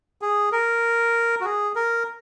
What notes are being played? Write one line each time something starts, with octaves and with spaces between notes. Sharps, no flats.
G#4
A#4
F#4
G#4
A#4